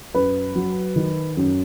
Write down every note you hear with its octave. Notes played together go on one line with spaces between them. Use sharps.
F#2 B4
F#3
D#3
F#2